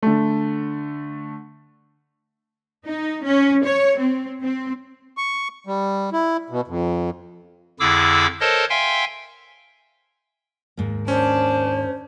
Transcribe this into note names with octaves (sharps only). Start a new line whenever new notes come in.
D3 A3
D#4
C#4
C#5
C4
C4
C#6
G3
E4
B2
F2
F2 D3 E4 G#4 D6 E6
A4 A#4 C5 C#5 D#5 A5
E5 F5 G5 G#5 C6
D#2 G#2 A#3
C#4 D4 C5